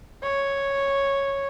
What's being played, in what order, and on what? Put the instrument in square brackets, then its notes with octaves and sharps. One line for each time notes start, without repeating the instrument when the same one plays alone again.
[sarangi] C#5